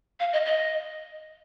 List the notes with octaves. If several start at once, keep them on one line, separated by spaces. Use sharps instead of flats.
F5
D#5
D#5